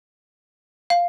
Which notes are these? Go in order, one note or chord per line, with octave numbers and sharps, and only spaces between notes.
F5